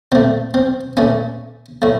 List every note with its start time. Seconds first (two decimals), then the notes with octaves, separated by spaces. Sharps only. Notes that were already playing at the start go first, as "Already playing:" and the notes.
0.12 A#2 A3 C4
0.54 C4
0.97 A#2 A3 C#4
1.82 A2 A3